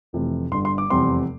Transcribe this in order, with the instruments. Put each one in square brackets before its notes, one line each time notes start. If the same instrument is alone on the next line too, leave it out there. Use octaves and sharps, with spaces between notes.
[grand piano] F1 F2 C3 E3 A3
G1 G2 D3 C6
C6
D6
F1 E2 C3 G3 C4 C6